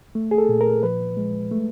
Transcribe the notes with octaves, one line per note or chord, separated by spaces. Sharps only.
A3
G#4
A4
A#2
A#4
F3 B4
G#3
A3